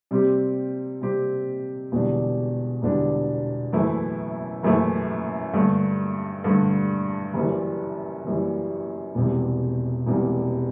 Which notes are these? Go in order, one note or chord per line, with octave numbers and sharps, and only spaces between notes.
C3 G3 C4 G4
C3 G3 C4 G4
E1 E2 D3 G3 D4
E1 E2 D3 G3 D4
F#1 F#2 E3 A3 E4
F#1 F#2 E3 A3 E4
G2 D3 A3
G2 D3 A3
F#1 F#2 E3 G3
F#1 F#2 E3 G3
E1 E2 C3 G3
E1 E2 C3 G3